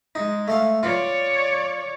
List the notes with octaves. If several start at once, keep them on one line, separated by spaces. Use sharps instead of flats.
G#3 D#4
A3 A4 F5
F4 C#5 D5